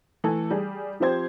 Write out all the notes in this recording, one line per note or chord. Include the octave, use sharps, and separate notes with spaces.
E3 A3 A4
G3 G#4
F3 C4 G4 C5 G#6